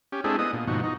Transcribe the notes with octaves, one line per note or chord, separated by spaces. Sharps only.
C#4 G4
G#3 C4 D4 E4 G#4 A4
B3 D#5 D#6
A#2
G#2 B2 D#3 F3 F#4
D#4